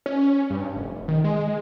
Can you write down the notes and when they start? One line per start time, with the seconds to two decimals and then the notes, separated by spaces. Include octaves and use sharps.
0.06 C#4
0.50 G2
0.76 F1
1.08 D#3
1.24 G#3